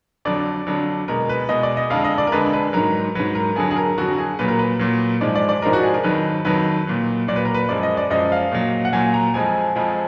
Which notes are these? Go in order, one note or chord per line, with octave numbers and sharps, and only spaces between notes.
F2 D3 F#3 D5
F2 D3 F#3
B2 G#3 A#4
B4
B2 G#3 D#5
D5
D#5
F2 D3 G#3 F5
D#5
D5
A#4
F2 D3 G#3 B4
B4
G#2 F#3 A#4
G#2 F#3 B4
A#4
F2 D3 F#3 G#4
G#4
A#4
F2 D3 F#3 F#4
G#4
A#2 F#3 B4
A#4
B4
A#2 F#3
G#2 F3 G#3 D5
D5
D5
G#2 F3 G#3 A#4
F#4
G#4
A#4
F2 D#3 F#3 B4
F2 D#3 F#3 B4
A#2 F#3
A#2 F#3 D5
B4
A#4
B4
F#2 F3 G#3 D5
D#5
D5
F#2 F3 G#3 D#5
F5
A#2 F#3
F#5
A#2 F#3 G#5
A#5
F2 F3 G#3 G#5
F2 F3 G#3